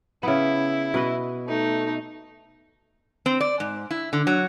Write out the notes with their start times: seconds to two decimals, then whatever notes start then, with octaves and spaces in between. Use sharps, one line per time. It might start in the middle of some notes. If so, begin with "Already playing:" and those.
0.23 C#3 B3 E4
0.94 B2 B4 D#5
1.47 A3 D#4
3.26 C4
3.41 D5
3.60 G#2
3.91 E4
4.13 D3
4.27 F#3